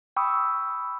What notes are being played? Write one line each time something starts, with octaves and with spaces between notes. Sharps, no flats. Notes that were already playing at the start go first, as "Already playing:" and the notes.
G5 B5 C#6 D#6 E6